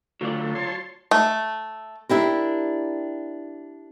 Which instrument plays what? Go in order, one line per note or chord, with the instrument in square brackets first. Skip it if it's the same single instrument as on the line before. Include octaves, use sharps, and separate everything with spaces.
[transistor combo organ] D3 A3 [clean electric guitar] F#3 F4 D5
[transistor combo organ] C#5 A5 C6
[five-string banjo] A3
[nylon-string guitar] D4 E4 G4 A#4